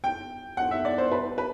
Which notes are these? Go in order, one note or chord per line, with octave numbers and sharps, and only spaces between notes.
G5
F#5
E5
D5
C5
B4
B4